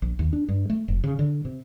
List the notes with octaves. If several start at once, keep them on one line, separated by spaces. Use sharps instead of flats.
A#1
D#2
D4
G2
A3
F1
C#3
D3
C3